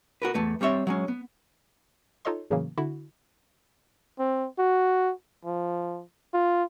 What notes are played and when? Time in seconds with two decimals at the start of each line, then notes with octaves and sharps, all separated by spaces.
0.22 F#4 A#4 B4
0.34 E2 A3 B4
0.61 G3 C4 C#5 E5
0.87 F#3 G#3 C#4
1.08 B3
2.25 D#4 F4 A4 C#5 D#5 C6
2.50 A2 C#3 E3 F#3 A#3
2.78 D3 E4 F#4
4.19 C4
4.58 F#4
5.45 F3
6.33 F4